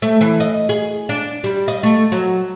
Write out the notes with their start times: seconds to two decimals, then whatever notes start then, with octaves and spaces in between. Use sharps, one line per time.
0.02 A3
0.21 E3
0.40 D#5
0.69 G#4
1.09 D4
1.44 G3
1.68 D#5
1.83 A3
2.12 F#3